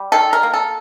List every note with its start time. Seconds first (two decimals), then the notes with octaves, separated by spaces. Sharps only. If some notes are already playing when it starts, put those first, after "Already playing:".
Already playing: G3
0.12 D#3 A4
0.33 A#4
0.43 A#3
0.54 A4